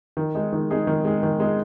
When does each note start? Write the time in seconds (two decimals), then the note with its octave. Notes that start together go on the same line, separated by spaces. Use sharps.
0.17 D#3
0.35 G#3 D#4 G#4
0.53 D#3
0.70 G#3 D#4 G#4
0.87 D#3
1.05 G#3 D#4 G#4
1.23 D#3
1.40 G#3 D#4 G#4